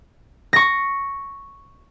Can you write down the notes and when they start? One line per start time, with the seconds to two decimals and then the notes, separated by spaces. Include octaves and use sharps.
0.53 C#6 A#6